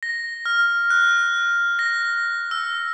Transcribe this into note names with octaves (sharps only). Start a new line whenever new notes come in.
A#6
F6
F#6
A#6
E6